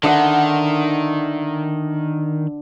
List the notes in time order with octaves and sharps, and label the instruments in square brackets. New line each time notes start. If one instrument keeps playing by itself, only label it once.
[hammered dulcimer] D3 E5 F#5 [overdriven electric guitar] D#3